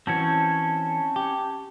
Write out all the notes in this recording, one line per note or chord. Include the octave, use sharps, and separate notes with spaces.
E3 C4 C#4 F#4 C#5 A5
G4